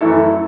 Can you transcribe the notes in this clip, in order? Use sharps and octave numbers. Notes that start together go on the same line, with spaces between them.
F#2 E3 A3 E4 A4